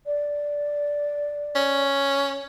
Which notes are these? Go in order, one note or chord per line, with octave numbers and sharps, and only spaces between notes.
D5
C#4